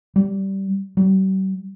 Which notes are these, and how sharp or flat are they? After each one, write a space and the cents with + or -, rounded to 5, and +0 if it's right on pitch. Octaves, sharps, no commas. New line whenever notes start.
G3 -15
G3 -45